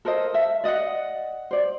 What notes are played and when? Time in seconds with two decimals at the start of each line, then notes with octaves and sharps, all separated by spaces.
0.05 A4 A#4 C5 D#5
0.34 E5
0.64 D5 D#5 F5 F#5
1.51 C5 D5